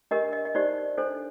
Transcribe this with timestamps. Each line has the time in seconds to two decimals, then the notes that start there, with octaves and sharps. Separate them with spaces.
0.11 D4 G4 A#4 D#5
0.33 D#5
0.45 D#5
0.55 D#4 G4 C5 D5
0.98 D4 A4 C5